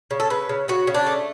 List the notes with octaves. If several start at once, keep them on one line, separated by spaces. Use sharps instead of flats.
C#3
A4
C#3 B4
C#3
C#3 F#4
C#3
D4
A3